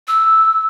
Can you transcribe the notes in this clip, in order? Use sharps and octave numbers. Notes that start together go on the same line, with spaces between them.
E6